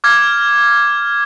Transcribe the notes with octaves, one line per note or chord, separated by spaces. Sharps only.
D6 F6 G#6